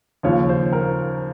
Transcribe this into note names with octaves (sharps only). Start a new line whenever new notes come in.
D#2 C#3 F3 C#5
C5
A#4